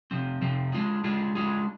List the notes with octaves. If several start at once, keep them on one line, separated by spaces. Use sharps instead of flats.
C3 F3 C4
C3 F3 C4
G#3 D4 F4 G#4
G#3 D4 F4 G#4
G#3 D4 F4 G#4